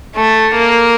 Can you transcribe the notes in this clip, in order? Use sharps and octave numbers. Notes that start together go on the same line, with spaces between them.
A3
A#3